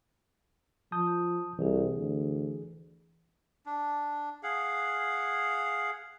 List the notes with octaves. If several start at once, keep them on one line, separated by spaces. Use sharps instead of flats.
F3 A5 D#6 G6
C2 E3 G#4
D2
D4
G#4 F5 F#5